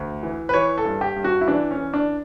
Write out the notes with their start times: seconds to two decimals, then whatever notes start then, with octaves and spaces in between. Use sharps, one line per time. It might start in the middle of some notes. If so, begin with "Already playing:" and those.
Already playing: D2
0.23 E3
0.49 B4
0.54 E3 C#5
0.78 A4
0.85 G2
1.01 G4
1.16 G2
1.24 F#4
1.41 E4
1.48 E3 D4
1.71 C#4
1.77 E3
1.94 D4